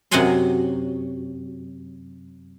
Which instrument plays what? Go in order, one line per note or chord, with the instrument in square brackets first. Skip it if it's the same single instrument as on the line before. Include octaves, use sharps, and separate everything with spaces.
[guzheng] F#2 C3 D#5 F#5 G#5 C6